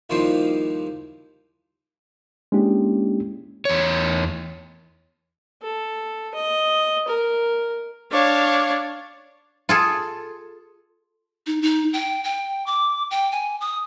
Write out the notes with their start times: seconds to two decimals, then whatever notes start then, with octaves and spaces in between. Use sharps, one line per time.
0.10 D#2 D#3 F3 G3 E4 C6
2.52 G#3 A#3 C#4 D4 E4 G4
3.65 E2 C#5
5.62 A4
6.35 D#5
7.08 A#4
8.12 D4 C#5 F5
9.69 F4 G#4 A4
11.47 D#4
11.62 D#4
11.93 G5
12.24 G5
12.66 D6
13.11 G5
13.32 G#5
13.61 D#6